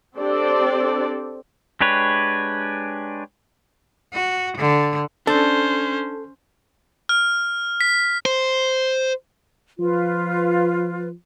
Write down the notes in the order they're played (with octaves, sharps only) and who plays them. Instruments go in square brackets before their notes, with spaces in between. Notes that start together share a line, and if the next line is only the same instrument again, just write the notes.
[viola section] C4 D4 G4 A4 C5 D5
[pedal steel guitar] G#3 D4 G4 B4 C#5
[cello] F#4
D3
[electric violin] C#4 C5 [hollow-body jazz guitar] D4 [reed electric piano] A4
[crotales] F6
B6
[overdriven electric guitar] C5
[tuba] F3 [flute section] F4 B4